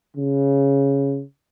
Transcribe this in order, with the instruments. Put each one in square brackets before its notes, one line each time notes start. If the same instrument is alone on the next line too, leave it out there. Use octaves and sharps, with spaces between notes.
[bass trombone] C#3